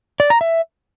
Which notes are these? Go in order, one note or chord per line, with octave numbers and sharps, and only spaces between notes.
D5
A#5
E5